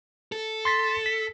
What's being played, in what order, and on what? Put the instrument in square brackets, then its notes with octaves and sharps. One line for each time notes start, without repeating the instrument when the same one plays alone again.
[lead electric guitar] A4
[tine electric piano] C6 A6 B6
B6